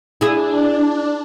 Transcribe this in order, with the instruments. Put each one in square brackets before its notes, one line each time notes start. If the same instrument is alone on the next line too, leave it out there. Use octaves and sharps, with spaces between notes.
[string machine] D4 [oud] E4 G#4